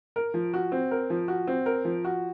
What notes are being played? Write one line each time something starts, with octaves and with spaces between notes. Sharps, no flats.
A#4
F3
F#4
C4
A#4
F3
F#4
C4
A#4
F3
F#4